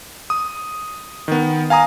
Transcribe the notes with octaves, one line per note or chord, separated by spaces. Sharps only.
D#6
D#3 B3
F5 G#5 A#5 D#6